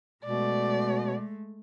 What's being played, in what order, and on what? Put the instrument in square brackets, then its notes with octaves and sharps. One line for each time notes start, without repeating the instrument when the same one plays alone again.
[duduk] B2 [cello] G#3 A3 [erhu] D5